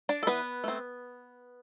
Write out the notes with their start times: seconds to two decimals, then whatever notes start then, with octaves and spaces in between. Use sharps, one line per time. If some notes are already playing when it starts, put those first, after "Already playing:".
0.09 D4 D5
0.23 A4
0.27 E3 B3 B4
0.64 A3 C4